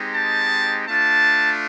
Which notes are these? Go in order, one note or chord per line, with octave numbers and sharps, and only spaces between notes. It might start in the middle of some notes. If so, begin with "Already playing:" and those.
Already playing: G#3 C4 D#4 G4
A5
A3 D4 F4 A5